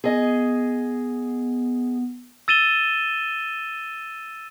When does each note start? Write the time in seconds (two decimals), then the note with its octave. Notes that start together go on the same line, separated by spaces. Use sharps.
0.04 B3 G#4 D#5
2.48 E6 A6 D#7 E7 G7